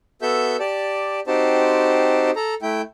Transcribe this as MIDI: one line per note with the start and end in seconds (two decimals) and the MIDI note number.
0.22 0.57 59
0.22 0.57 66
0.22 0.57 69
0.22 0.57 76
0.22 0.57 88
0.22 0.57 91
0.59 1.20 67
0.59 1.20 74
0.59 1.20 81
1.27 2.31 60
1.27 2.31 63
1.27 2.31 66
1.27 2.31 67
1.27 2.31 72
1.27 2.31 81
2.36 2.54 69
2.36 2.54 82
2.62 2.82 57
2.62 2.82 64
2.62 2.82 79